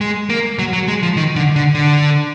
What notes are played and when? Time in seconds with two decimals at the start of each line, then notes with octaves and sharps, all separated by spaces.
0.01 G#3
0.30 A#3
0.59 F#3
0.73 F#3
0.88 G#3
1.03 F3
1.17 D#3
1.36 D3
1.56 D3
1.75 D3